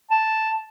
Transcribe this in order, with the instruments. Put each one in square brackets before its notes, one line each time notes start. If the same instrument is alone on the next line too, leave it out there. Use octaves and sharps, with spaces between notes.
[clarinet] A5